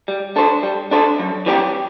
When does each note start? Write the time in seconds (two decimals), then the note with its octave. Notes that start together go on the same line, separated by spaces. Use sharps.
0.08 G3
0.36 D4 A4 C5
0.63 G3
0.91 D4 A4 C5
1.19 F#2
1.46 E3 G3 C4 G4